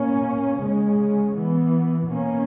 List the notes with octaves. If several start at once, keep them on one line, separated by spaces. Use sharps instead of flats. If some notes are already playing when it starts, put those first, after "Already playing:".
Already playing: B2 A#3 C#4
C#3 G#3 C#4
E3 B3
B2 A#3 C#4